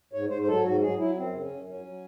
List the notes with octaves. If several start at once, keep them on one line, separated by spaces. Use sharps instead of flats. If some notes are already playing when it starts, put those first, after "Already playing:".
G#2 C#5
G#2 C5
C5
F#3 A4
G#2 F#4
F#3 G#4
F#3 E4
F#2 C4
C#3
C#4
F#2
F#3 C#4
F#3